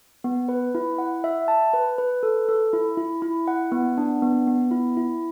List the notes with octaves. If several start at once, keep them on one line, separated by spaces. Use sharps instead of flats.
B3
B4
E4
F#5
E5
A5
B4
B4
A4
A4
E4
E4
E4
F#5
B3
D4
B3
B3
E4
E4